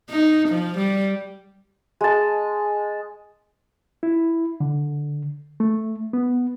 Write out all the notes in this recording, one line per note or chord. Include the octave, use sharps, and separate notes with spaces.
D#4
F3
G3
G#3 A5
E4
D3
A3
B3